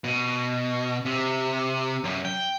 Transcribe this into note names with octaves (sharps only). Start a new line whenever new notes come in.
B2
C3
F#2
G5